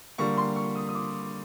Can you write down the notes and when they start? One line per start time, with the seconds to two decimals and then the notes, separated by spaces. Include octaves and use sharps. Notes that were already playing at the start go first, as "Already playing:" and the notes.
0.18 D3 G3 A#3 C#6
0.37 C6
0.56 C#6
0.75 D#6
0.89 D#6
0.95 D6